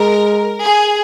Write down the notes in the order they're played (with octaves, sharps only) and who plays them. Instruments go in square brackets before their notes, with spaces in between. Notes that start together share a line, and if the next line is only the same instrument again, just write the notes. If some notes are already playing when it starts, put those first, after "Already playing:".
Already playing: [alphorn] G#3 [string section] A#4
[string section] G#4